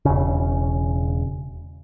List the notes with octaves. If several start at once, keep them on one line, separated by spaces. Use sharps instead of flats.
E1 C#3